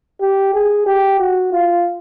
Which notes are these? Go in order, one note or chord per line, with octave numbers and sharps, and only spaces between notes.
G4
G#4
G4
F#4
F4